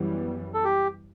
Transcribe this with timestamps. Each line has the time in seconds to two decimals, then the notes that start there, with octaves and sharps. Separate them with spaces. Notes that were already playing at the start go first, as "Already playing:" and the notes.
Already playing: F#2 E3 G3 B3
0.54 A4
0.64 G4